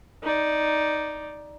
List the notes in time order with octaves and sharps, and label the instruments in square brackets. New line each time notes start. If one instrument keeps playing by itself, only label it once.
[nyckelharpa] D#4 D5